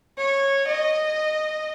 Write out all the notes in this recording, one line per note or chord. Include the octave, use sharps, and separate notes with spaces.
C#5
D#5